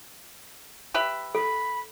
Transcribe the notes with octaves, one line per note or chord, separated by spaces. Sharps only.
G4 B4 E5
A4 B5